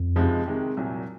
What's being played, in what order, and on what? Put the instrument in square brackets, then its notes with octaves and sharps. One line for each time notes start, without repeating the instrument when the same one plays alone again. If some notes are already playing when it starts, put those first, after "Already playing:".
Already playing: [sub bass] F2
[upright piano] C#2 C3 F3 G#3 D#4
C3 D#3 G#3
C2 A#2 F#3